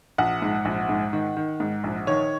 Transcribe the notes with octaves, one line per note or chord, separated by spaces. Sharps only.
A#1 F#5
G#2
A#1
G#2
D#3
D#3
G#2
A#1
D#3 C#5